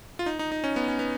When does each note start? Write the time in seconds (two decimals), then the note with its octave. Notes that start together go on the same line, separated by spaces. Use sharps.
0.19 F4
0.26 D#4
0.39 D#4
0.52 D#4
0.64 C#4
0.76 B3
0.88 C#4
0.99 B3